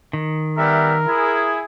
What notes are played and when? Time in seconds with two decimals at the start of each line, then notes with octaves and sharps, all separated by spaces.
0.13 D#3
0.57 G3 B3 A#4 E5
1.07 E4 G#4